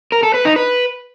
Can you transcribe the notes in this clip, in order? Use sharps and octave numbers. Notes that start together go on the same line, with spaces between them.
A#4
A4
B4
D#4
B4